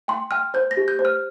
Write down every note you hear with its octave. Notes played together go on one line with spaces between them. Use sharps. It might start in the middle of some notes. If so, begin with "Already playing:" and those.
G5 C6
G5 F6
C5 G6
A#6
G4
G6
C5
F6